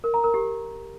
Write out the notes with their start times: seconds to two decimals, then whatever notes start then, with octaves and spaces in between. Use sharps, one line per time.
0.04 A#4
0.14 A#5
0.24 A#4
0.34 G4